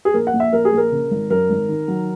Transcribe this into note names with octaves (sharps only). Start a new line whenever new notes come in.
G#4
A#1 A#4
F#5
A#1
E5
A#1 A#4
G#4
A#1
A#4
C#3
G#1
F#2 A#4
G#1
D#3
F#3